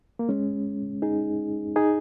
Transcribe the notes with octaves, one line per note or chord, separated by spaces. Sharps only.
A#3
G#3 C#4
D#4 G#4
D#4 G#4